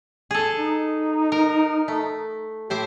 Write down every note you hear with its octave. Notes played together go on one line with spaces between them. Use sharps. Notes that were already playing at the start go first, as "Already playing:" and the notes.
G#4 A4
D#4
A#4
A3
A2 G4 C5 E5